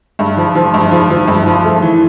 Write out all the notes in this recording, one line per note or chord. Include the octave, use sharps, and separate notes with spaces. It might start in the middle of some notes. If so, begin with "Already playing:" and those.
G2
F3
F3
G2
F3
F3
G2
F3
A3
E3